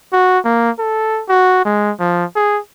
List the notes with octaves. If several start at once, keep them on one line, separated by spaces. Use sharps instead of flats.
F#4
A#3
A4
F#4
G#3
F3
G#4